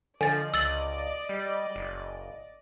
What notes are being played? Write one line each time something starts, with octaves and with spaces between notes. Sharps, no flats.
D3 F3 D5 D#5 G#5 A6
C#2 E6 A6 F#7
G3
F#1